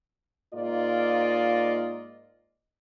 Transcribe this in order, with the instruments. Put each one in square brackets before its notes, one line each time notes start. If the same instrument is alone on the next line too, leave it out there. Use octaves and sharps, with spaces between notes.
[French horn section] G#2 A#3 F4 D5 D#5